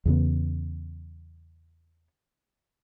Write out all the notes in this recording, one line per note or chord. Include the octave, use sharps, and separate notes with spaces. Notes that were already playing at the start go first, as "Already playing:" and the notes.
E2 C#3 B3